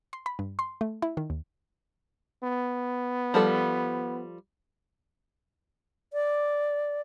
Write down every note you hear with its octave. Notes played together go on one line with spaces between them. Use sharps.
C6
B5
G2
C6
A3
E4
D#3
D#2
B3
F3 G3 A4
D5